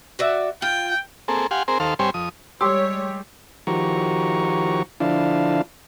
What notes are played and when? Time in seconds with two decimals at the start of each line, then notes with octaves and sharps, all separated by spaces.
0.19 F#4 D5 E5
0.62 F4 G5
1.28 A#3 C4 G#4 A4
1.51 G4 F5 F#5 G#5 C6
1.68 C4 G#4 A#4 C5
1.80 D#2 A4 C5 F5
1.99 G2 G3 C4 C5 C#5 G#5
2.14 F2 D#6
2.61 G3 G#3 G4 C#5 C6 D6 E6
3.67 D#3 F3 F#4 G4 A#5 C#6
5.00 D3 F3 D4 E4 F5 A5